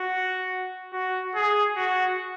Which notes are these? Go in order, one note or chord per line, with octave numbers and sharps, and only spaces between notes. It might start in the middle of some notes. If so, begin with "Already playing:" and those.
Already playing: F#4
F#4
G#4
F#4